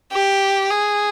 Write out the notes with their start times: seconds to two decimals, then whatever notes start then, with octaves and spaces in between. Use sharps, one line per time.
0.13 G4
0.70 G#4